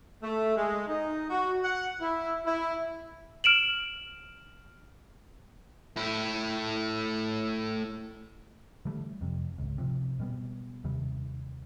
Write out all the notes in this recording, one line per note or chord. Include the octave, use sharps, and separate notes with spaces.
A3
G#3
D#4
F#4
F#5
E4
E4
F6 D7 E7 F#7
A2 E4
D3 E3 G3 A3
F2 C3
G#1 C#2
C3 F3
B2 G3 B3
D#2 C3 D#3 G3